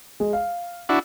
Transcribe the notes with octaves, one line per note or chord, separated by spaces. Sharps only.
G#3
F5
D4 E4 F#4